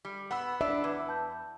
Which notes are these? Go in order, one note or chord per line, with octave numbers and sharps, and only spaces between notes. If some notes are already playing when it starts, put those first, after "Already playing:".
G3
B3 F#5 B5 E6
D4 D5 E5
E2 B4 D6 G#6
A5 G6